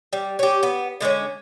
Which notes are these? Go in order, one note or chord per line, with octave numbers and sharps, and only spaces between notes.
G3
C#4 G4
B3
D3 G#3 A3 C#4